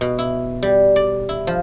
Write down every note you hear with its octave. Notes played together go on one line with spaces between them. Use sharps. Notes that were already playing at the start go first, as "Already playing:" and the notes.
B2
E4
G3
D5
E4
F3